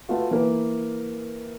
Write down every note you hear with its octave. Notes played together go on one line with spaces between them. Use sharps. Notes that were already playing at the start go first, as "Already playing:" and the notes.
A3 B3 F4 F#4
E3 A#3 B4